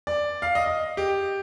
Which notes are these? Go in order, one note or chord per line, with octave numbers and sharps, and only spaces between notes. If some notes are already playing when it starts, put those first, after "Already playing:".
D5
F5
D#5
D#5
G4